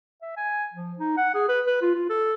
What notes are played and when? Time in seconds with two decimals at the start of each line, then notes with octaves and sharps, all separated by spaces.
0.22 E5
0.37 G#5
0.73 F3
0.99 D#4
1.17 F#5
1.34 G#4
1.48 B4
1.66 B4
1.82 F4
1.95 F4
2.10 A4